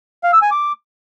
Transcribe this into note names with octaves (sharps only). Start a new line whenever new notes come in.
F5
E6
G#5
D6